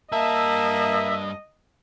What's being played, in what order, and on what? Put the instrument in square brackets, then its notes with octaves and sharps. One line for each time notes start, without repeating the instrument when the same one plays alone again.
[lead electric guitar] G2 A5 [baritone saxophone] A#3 [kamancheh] D#5 [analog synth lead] E5